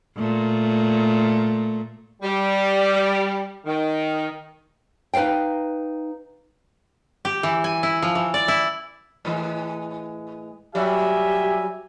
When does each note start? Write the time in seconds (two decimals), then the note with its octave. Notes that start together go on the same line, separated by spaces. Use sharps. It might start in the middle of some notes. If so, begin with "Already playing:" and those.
0.17 A#2 A3
2.22 G3
3.66 D#3
5.14 D#4 B4 D5 F5 G5
7.25 G4
7.43 E3
7.64 G#5
7.83 E4
8.02 F3
8.15 E3
8.34 D5
8.48 E4
9.25 A2 E3 G#3
10.75 F#3 G3 F#4 G4 E5 G#5